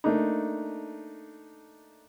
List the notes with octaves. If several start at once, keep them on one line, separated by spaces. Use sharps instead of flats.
A3 A#3 D4 D#4